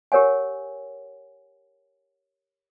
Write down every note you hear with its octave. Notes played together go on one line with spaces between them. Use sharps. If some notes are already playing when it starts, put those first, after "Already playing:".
G4 A#4 C#5 F#5 G#5